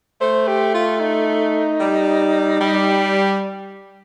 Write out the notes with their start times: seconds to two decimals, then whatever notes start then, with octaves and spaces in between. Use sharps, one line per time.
0.21 A3 C5
0.48 G4
0.74 F4
1.00 D#4
1.80 G3
2.60 G3